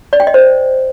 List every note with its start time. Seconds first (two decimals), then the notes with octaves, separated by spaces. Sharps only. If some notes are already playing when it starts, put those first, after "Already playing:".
0.13 D5
0.20 G5
0.27 D#5
0.34 C5